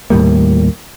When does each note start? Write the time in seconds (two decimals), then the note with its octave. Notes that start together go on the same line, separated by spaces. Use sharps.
0.10 D#2 A2 G3 A#3